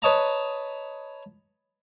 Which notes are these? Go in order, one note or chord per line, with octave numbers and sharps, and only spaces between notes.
B4 C#5 D#5 A5 A#5